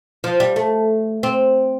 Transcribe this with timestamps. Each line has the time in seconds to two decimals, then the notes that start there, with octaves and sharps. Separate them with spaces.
0.24 F3
0.40 G3
0.56 A3
1.23 C4